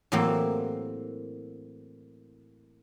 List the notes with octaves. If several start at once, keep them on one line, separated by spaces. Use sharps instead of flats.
A2 E3 F#3 A#3 C4 G4